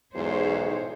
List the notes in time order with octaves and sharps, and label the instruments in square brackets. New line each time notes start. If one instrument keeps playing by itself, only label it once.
[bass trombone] B1 [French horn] E2 [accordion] G#2 [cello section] C5 C#5